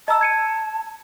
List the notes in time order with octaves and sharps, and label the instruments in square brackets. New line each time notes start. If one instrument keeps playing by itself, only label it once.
[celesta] D#5 A#5 E6 [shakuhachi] A5
[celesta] G#6 C#7 D#7